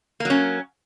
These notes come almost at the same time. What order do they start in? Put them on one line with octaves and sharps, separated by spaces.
A#3 F#3 C#4